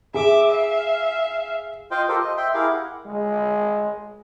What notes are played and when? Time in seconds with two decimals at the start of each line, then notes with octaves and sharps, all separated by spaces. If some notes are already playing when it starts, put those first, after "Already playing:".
0.14 G#4 E5 D6
0.49 E5 F5
1.91 F4 C5 D#5 F5 G5
2.09 F4 G4 A4 A#4 C5
2.21 D#5
2.37 E5 G5 C6
2.54 E4 G4 G#4 A#4 F5
2.70 F#5
3.06 G#3